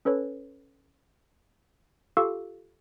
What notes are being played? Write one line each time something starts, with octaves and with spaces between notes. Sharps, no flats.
C#4 A4 B4 C#5
F4 G4 A4 F5 C#6 E6